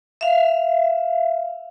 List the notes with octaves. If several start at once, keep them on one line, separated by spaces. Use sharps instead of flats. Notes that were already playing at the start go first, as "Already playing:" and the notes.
E5 F5